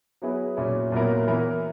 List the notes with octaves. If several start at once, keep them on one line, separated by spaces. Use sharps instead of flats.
F#3 B3 E4 G#4 B4
A#2 F#3 C#4 E4
A#2 F#3 B3 E4 A#4
E3 B3 E4 A#4